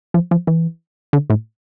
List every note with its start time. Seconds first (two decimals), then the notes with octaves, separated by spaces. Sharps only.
0.14 F3
0.31 F3
0.47 E3
1.13 D3
1.30 A2